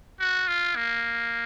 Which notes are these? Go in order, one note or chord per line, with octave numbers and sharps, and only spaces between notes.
F#4
F4
A#3